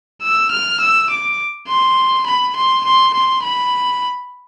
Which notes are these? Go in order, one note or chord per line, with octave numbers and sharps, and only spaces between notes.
E6
F6
E6
D6
C6
B5
C6
C6
C6
B5